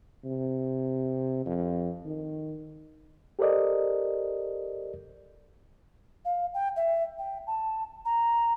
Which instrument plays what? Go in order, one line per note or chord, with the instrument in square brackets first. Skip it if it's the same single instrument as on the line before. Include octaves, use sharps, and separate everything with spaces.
[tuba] C3
F2
D#3
[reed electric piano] G4 A4 A#4 C5 D5 D#5
[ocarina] F5
G5
E5
G5
A5
A#5